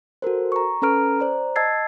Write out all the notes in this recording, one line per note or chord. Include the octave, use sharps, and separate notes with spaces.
F#4 A4 A#4 C5
A#5 C#6
C#4 A4 B4 A#5 F6 D7
C5 D5 A#5
D#5 A5 E6 G#6 A6 C7